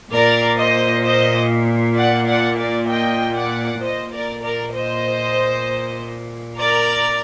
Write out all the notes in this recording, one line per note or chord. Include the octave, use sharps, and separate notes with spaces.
A#2 A#4 D5
C5 D#5
C5 D#5
D5 F#5
D5 F#5
A#4 D5
D#5 G5
D5 F#5
A#2 C5 D#5
A#4 D5
A#4 D5
C5 D#5
A#4 D5